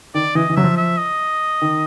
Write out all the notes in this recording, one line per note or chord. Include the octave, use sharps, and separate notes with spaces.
D#3 D5
E3 D#5
E3
F#3 E5
F3
E5
D#5
D#3